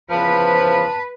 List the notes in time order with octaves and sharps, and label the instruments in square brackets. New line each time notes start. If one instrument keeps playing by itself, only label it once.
[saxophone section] E2 C#3 F3 [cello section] B4 [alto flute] A5